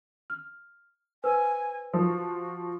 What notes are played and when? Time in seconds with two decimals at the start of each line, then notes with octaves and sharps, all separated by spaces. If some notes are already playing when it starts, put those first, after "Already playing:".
0.30 F6
1.24 B4 C5 G#5 E6
1.94 F3 F#4